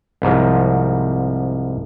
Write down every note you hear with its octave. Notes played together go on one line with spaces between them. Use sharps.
C2 G#2 F3